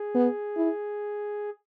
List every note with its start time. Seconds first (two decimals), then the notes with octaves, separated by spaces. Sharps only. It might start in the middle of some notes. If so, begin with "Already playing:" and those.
Already playing: G#4
0.15 B3
0.57 E4